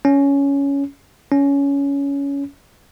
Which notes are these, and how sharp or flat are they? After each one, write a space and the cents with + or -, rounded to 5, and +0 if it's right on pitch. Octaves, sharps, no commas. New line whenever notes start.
C#4 +10
C#4 +15